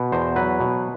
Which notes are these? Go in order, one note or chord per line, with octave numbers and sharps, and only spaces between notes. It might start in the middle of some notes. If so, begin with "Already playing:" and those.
Already playing: B2
E2 C5
F#3 B4
B2